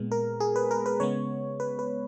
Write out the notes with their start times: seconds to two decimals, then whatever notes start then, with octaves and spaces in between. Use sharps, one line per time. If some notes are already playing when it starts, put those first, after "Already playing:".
Already playing: A#2 G#3 B3
0.12 A#4
0.40 G#4
0.56 B4
0.71 A#4
0.86 B4
1.00 C#3 G#3 B3 C#5
1.60 B4
1.79 B4